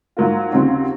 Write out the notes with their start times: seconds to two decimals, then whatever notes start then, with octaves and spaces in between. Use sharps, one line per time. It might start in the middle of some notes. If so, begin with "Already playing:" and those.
0.17 G#2 F#3 A#3 F4
0.52 D#2 C#3 F#3 C4 F4